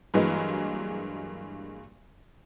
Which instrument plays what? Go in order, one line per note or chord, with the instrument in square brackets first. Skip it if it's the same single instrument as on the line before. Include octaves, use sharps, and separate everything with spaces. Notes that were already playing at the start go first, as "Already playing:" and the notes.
[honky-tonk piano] G2 E3 F#3 G#3 A#3